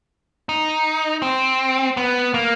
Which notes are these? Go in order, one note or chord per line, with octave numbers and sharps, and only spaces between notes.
D#4
C4
B3
A#3